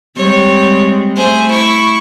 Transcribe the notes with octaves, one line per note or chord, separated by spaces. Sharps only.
G3 G#3 C4 C#5
A3 G#4 C5
E4 C#6